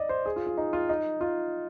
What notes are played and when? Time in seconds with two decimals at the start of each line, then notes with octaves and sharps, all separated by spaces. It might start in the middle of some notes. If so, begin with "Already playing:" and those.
Already playing: D5 D#5
0.09 C5
0.26 G#4
0.36 F4
0.47 F4
0.57 D#4
0.73 F4
0.89 D#4
1.21 F4